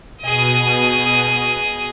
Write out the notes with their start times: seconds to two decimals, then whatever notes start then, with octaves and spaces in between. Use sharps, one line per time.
0.22 B2 G#4 D#5